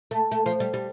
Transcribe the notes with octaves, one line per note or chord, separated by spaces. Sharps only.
A3
A3
F3
G3
G3